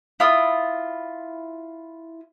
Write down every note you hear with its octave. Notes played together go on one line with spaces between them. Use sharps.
E4 F4 D#6